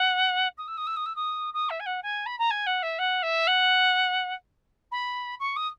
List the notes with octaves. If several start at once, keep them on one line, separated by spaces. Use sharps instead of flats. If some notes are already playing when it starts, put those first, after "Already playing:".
Already playing: F#5
D#6
E6
D#6
E6
D#6
E6
D#6
D#6
E5
G#5
F#5
G#5
B5
A#5
G#5
F#5
E5
F#5
E5
F#5
B5
C#6
D#6